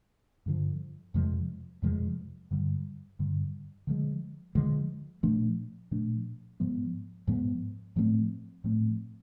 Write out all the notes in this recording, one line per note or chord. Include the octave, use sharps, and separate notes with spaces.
G2 D3 F3
F2 C3 F3 G#3
F2 C3 F3 G#3
G2 D3 G3
G2 D3 G3
D3 F3 G#3
D3 F3 G#3
A#2 F3 A3 D4
A#2 F3 A3 D4
G#2 F3 G#3 B3
G#2 F3 G#3 B3
A2 F3 A3 C4
A2 F3 A3 C4